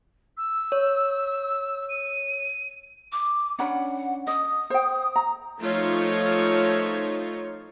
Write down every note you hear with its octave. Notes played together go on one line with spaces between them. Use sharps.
E6
C#5
D#7
D6
C#4 D4 F#5 B5
D#5 D#6
C5 G5
A#5
F3 A3 D#4 F4 C#5